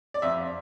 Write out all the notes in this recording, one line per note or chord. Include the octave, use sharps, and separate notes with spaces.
D5
F2 E5